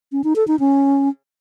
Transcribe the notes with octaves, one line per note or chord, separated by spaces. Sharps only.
C#4
D#4
A4
D#4
C#4